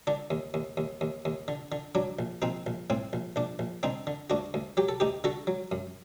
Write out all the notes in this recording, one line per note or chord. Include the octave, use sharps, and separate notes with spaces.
D3 D4
D#2
D#2
D#2
D#2
D#2
D3
D3
F#3 D4
A#1
A#1 C4 D#4
A#1
A2 C4
A#1
A#1 D4
A#1
D3 C4 D#4
D3
D2 D4 F#4
D2
F#3 G4
A4
D2 D#4 G4
D3 F#4 A4
F#3
F#2